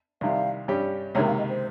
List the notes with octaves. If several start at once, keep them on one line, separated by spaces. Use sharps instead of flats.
C2 C3 D#3 G3 F5
G2 G3 C#4 G4
C#2 C3 D#3 A#3 C#5
F5
D#5
C5